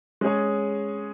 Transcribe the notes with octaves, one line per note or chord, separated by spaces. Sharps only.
G#3 C#4 G#4 C#5